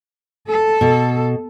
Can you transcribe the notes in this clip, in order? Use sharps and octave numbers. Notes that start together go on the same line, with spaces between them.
A4
B2